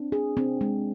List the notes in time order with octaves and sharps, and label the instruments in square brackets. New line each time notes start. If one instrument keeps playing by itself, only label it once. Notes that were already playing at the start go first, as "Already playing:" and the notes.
Already playing: [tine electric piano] C4 D4
[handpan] G#4
[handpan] C4 [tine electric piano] D4
[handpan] G#3